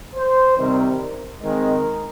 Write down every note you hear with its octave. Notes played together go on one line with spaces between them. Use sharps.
C5
C3 D#3 G3 C4 A#4
D#3 G#3 C4 A#4